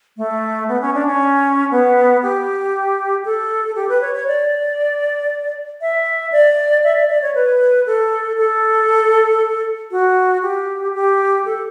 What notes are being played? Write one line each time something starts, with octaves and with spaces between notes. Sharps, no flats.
A3
B3
C#4
D4
C#4
B3
G4
A4
G4
B4
C#5
C#5
D5
E5
D5
E5
D5
D5
C#5
B4
A4
A4
F#4
G4
G4
A4